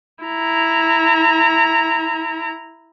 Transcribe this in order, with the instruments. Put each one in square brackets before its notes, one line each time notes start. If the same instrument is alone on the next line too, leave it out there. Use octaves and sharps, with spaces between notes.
[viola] E4 A#5